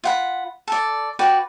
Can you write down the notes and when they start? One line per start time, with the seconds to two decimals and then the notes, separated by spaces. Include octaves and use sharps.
0.04 F4 F#5 B5
0.68 A4 D5
1.19 F#4 B4 D5 G5